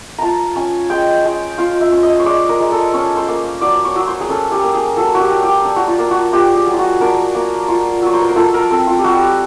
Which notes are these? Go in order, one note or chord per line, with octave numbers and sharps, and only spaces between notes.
F4 A5 A#5
C#4 G#5
G#3 G5
G#3
F4 F5
E5
C#4
D#5
C#5
G#3 D5
A#4
G#3
A4
C#4 C#5
C5
A#3
F#3 D5
C#5
F#3
C5
G#4
C#4 A4
G4
A#3
G#4
F#3 A4
F#4
G4
F#3
G4
D4
F#4
F4
A#3
F#4
F4 G4
G#4
F#3
F4
F#4
D4 A#4
A#3
F4
F#3 C#5
C5
B4
A#4
F4 A4
A#4
C4 A4
F4
G4
G3 F#4